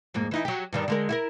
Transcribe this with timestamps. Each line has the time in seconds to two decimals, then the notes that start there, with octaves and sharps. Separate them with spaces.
0.14 F2 G#2 A#3
0.31 E3 D#4 E4
0.45 F#3 G4
0.73 G2 D#3 G3
0.88 D3 G#3 A#4
1.09 E4 F#4 A#4